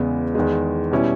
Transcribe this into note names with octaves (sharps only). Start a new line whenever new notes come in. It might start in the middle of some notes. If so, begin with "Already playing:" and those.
Already playing: E2 C#3 G#3 B3
E2 D#3 G#3
B2 G3 C#4 E4